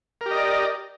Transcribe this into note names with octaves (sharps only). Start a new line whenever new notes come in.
G4 A#4 D5 D#5